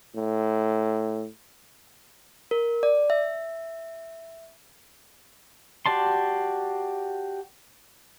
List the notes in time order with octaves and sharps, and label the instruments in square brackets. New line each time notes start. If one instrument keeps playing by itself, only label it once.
[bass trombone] A2
[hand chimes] A#4
D5
E5
[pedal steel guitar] F#4 G4 D5 A5 C6